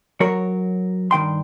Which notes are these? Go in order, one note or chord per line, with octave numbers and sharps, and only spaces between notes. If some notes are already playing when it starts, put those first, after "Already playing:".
F#3 F#4 A#4 C#5
G2 D#3 G5 C6